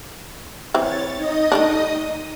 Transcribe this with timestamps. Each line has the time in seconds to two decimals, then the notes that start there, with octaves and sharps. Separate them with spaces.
0.74 E3 C4 C#5 A6
1.16 D#4 D#5 D#6
1.52 D#3 A3 D4